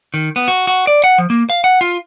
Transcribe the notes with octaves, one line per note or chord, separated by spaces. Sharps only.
D#3
B3
F#4
F#4
D5
F#5
F3
A#3
F5
F#5
F4